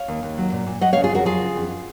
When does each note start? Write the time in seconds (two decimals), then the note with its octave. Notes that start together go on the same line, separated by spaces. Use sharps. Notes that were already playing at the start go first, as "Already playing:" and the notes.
Already playing: C#5 F5
0.08 D#2
0.23 D#2
0.38 F#3
0.52 A#2
0.66 A#2
0.81 F#3 D#5 F#5
0.93 C#5 F5
0.97 C#3
1.04 F4 G#4
1.12 F2 F#4 A#4
1.25 F#3 F4 G#4
1.41 C#3
1.56 F2